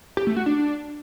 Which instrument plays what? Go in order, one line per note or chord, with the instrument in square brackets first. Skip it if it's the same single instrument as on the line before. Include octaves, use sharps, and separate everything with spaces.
[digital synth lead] G4
A3
F#4
D4